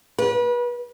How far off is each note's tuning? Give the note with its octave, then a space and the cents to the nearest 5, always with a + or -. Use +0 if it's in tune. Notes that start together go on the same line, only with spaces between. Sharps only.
B4 -30